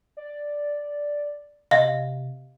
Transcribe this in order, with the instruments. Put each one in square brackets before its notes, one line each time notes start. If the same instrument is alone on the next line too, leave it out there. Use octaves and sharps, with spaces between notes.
[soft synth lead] D5
[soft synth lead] C3 [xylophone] D#5 F5